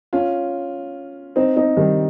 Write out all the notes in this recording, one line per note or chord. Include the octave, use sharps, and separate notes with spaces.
C#4 F4
C4 D#4
C4 D#4
D#3 G3